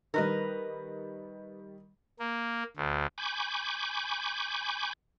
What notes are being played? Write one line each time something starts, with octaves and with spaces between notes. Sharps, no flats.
D#3 G3 A#4 B4 D#5
A#3
D2
G#5 B5 C#6 D6 G6